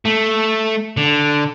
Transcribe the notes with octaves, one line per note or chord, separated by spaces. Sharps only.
A3
D3